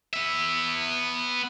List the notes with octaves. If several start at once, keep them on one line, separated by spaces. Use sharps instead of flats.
B3 E5